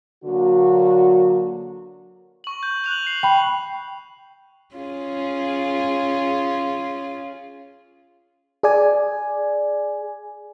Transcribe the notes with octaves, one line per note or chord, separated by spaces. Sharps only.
D3 F#3 A#3 F#4
C#6 F#7
G6
F#6 F7 F#7
C7
G5 B5
C#4 F4 G#4
G#4 D5 G#5